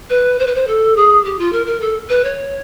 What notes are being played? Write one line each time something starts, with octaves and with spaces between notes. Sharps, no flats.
B4
C5
B4
C5
A4
G#4
G4
F4
A#4
A#4
A4
B4
C#5